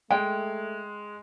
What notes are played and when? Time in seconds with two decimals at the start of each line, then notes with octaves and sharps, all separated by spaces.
0.11 G#3 A3 G5